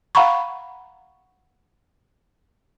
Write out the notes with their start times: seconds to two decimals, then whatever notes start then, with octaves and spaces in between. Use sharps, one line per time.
0.15 F5 F#5 A#5 B5 C#6